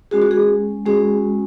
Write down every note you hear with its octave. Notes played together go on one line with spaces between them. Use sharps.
G#3 C#4 F#4 G#4
F#4
G#4
G#3 C#4 F#4 G#4